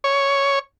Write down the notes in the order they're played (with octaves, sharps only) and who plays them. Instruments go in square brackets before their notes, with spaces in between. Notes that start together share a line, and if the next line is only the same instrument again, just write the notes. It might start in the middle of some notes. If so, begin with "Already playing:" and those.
[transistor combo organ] C#5